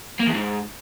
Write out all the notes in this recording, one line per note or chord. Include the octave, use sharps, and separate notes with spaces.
A#3
E2
G#2